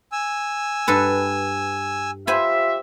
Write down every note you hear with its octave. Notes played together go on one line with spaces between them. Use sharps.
G#5 E6
G2 A4 B4
F4 G4 C5 E5 G#5 B5